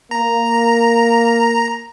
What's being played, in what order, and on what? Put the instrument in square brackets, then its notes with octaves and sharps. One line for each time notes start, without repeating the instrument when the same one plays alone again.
[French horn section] A#3 [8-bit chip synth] A#5